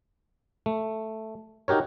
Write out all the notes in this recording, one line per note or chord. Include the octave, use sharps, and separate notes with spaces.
A3
D#4 F#4 G4 A#4 C#5